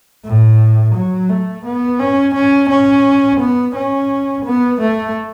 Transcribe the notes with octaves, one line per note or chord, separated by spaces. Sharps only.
A2
F#3
A3
B3
C#4
C#4
C#4
B3
C#4
B3
A3